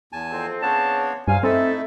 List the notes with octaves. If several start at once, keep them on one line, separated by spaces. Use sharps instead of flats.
E2 G#5 A5
F2 C4
C#3 B3 C4 D4 C#5 A5
G2 F#3 C5 D5 F5 G#5
A3 C4 D#4 E4 A4 E5